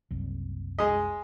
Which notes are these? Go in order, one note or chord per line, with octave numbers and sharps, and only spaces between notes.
F#1 C2
G#3 D#5